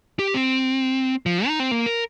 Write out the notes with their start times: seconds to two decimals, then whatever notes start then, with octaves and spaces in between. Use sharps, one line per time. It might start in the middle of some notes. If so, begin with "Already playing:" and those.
0.19 G4
0.34 C4
1.26 F3
1.47 D#4
1.60 C4
1.71 A#3
1.86 A#4